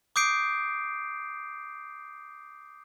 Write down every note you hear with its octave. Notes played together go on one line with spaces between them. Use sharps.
D6 D#6 G6 C7 D7